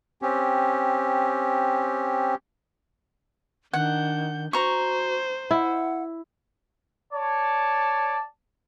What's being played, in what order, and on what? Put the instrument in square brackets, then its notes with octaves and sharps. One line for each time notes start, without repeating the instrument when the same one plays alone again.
[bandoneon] C4 C#4 G4
[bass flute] D#3 [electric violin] D4 G6 [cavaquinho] F#5
[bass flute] F#4 [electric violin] C5 [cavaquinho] A#5 C#6
[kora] E4 [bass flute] F#5
[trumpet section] C#5 D5 A5